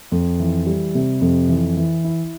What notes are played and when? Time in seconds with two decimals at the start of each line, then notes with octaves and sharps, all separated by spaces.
0.12 F2
0.40 E3
0.66 G3
0.95 C3
1.21 F2
1.49 E3
1.77 E3
2.04 E4